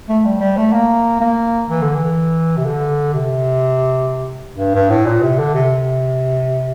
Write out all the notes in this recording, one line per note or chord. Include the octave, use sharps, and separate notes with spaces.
A3
G3
G3
A3
A#3
A#3
E3
D3
E3
C3
D3
C3
G2
G2
A2
A#2
C3
D3
C3